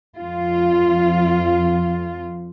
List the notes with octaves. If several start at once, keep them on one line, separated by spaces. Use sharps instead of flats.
F2 F3 F4